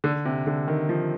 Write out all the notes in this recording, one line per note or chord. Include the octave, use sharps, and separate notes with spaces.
D3
C3
D3
D#3
F3